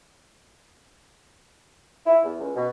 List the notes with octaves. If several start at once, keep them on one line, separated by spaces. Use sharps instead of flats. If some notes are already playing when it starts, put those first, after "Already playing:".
E4
E2
C#2
B2